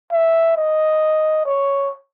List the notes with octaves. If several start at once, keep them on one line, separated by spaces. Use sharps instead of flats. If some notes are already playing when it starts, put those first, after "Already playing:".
E5
D#5
C#5